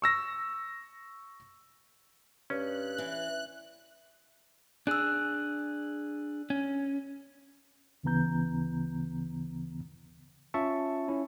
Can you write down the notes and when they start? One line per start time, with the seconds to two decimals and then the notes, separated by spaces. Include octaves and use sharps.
0.02 C#6 E6 A#6
2.50 G2 C#4 F#6
2.98 E3
4.87 D4 G#4 E6 F#6
6.50 C#4
8.03 D2 C#3 E3 B3 A#5 G6
10.54 C#4 F4 E5 A5 C#6
11.08 C#4 E4